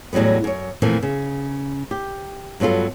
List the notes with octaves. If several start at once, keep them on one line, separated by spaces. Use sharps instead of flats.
E2 A2 F#3 G3 B3
F#2 C#5
F2 A#2 E3 F3 A3
C#3
G4
G2 F#3 B3 F4 A4